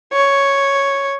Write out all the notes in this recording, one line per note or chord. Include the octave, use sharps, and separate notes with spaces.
C#5